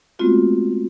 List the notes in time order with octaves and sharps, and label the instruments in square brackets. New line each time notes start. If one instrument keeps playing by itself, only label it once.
[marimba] G#3 A3 B3 C4 F4 F#4